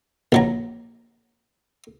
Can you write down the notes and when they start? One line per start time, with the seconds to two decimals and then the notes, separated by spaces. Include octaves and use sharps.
0.32 A#1 F#3 A#5